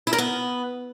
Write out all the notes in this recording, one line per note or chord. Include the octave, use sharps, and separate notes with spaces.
E4
A#4
B3